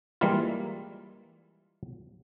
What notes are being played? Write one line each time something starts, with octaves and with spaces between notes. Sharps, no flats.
E3 G3 G#3 A#3 E4 F4